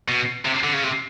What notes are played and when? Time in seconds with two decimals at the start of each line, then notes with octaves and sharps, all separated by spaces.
0.08 B2
0.45 C3
0.63 D3
0.73 C#3
0.83 C3